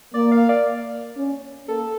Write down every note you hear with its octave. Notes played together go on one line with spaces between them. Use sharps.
A#3 D5
F5
D5
C#4
A#3 A4